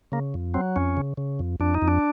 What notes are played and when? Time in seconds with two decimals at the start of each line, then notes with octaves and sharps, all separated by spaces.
0.12 C#3 A#3
0.34 F2
0.54 F#3 C4
0.76 F2 C#4
0.97 C#3
1.17 C#3
1.39 F2
1.60 F2 D4
1.74 D#4
1.82 F2
1.88 D4